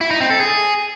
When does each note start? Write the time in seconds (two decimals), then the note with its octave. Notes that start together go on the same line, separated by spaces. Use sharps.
0.01 E4
0.11 D#4
0.21 C4
0.30 A4
0.40 G#4